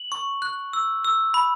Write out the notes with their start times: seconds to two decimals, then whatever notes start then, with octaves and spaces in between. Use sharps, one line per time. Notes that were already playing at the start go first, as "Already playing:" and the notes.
Already playing: F#7
0.12 C#6
0.42 F#6
0.73 E6
1.05 E6
1.34 B5